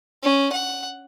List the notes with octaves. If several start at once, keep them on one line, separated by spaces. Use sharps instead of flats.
C#4
F#5